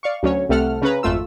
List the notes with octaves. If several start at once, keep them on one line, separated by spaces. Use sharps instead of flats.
D5 F5 C#6
D2 F#3 C#4 C#5
C2 C3 A3 A4 F#5 F6
C#3 C#4 B4 A#5
G#1 F2 A3 F4 E6